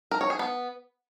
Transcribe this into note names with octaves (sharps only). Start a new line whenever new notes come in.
A#4
C#5
G#4
B3